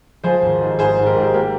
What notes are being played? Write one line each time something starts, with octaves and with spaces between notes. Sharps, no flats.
F3 G#4 C5
G#1
G#2
G#2 G#4 C5
G#2
G4 A#4
G#2
A#3 G4 A#4